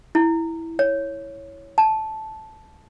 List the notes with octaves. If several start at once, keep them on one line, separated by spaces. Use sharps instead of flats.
E4
C#5
A5